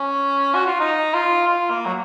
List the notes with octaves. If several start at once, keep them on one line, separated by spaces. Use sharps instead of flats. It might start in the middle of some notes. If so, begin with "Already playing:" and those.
Already playing: C#4
F#4
F4
D#4
F4
F4
A#3
F#3